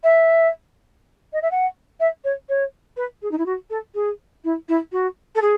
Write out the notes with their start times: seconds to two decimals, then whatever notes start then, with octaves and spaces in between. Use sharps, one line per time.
0.03 E5
1.33 D#5
1.42 E5
1.51 F#5
2.00 E5
2.24 C#5
2.49 C#5
2.96 B4
3.22 G#4
3.31 D#4
3.38 E4
3.46 F#4
3.70 A4
3.94 G#4
4.44 E4
4.68 E4
4.92 F#4
5.35 A4
5.41 G#4